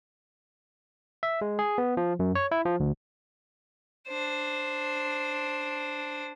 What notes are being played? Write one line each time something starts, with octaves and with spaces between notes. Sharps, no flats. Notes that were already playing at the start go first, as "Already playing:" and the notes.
E5
G#3
G#4
B3
F3
F#2
C#5
E4
F3
D2
D4 C5